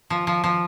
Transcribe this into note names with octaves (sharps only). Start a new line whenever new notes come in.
F3
F3
F3